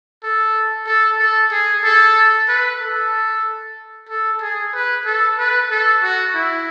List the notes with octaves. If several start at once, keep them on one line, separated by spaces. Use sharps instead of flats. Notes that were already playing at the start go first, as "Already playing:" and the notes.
A4
A4
A4
G#4
A4
B4
A4
A4
G#4
B4
A4
B4
A4
F#4
E4